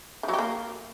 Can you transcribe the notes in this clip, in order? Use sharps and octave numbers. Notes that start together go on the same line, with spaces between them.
D#3
F#3
G4
A#3